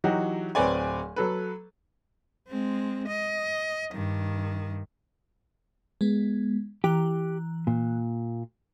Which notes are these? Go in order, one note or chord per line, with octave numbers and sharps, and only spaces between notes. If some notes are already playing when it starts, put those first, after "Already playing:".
E3 F#3 D#4 F#4 G4
D1 C4 B4 C#5 D5 G#5
F#3 A4 B4
G#3 C4
D#5
G2 D#3
G#3 B3
E3 G4 A#5 F#6
A#2